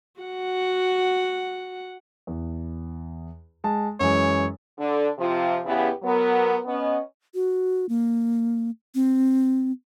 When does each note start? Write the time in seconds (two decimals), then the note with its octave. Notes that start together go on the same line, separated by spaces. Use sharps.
0.21 F#4 F#5
2.27 E2
3.64 G#3 A5
4.00 F#2 E3 G#3 C#5
4.79 D3 D4 A4
5.18 C3 F3 F4
5.65 E2 C#3 B3 E4 G4 B4
6.03 F#3 B3 A#4
6.65 B3 C#4 D#5
7.34 F#4
7.89 A#3
8.95 C4